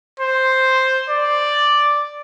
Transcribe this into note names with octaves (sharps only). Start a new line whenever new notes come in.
C5
D5